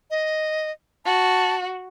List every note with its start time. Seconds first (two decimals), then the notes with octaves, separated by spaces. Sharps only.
0.10 D#5
1.05 F#4 A5